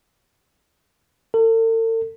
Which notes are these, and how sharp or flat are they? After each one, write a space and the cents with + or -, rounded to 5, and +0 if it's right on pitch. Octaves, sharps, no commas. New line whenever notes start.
A4 +45